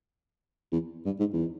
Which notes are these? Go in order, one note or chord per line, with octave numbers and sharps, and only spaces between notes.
E2
G2
G#2
E2